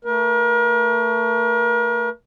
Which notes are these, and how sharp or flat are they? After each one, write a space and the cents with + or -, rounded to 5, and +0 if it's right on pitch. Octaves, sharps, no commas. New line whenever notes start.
A3 +30 A#4 +40